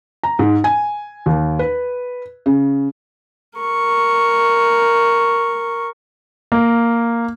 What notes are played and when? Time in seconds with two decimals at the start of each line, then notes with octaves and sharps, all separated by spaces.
0.23 A#5
0.39 G#2
0.64 G#5
1.26 D#2
1.59 B4
2.46 C#3
3.59 A#4 C#6
6.52 A#3